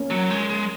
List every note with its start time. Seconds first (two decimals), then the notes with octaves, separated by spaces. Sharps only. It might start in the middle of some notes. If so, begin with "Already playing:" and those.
Already playing: A#3 C#4
0.10 F#3
0.30 G#3
0.50 G#3